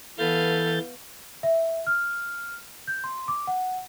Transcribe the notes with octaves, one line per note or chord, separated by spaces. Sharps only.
E3 B3 A4 F5 G6 A6
E5
F6
G6
C6
D6
F#5